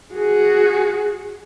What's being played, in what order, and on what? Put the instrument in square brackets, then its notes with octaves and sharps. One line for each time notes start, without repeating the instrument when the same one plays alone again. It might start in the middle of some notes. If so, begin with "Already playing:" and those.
[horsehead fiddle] F#4 G#4